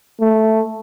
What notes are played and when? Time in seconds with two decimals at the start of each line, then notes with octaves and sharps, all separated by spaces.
0.20 A3